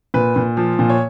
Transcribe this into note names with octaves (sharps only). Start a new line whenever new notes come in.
A#2 B4
A#2
F3
A#2
C#5